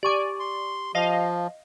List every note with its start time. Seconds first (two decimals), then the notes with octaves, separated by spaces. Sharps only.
0.03 G4 D5 G#5 C#6 D6
0.40 C6
0.95 F3 D#5 F5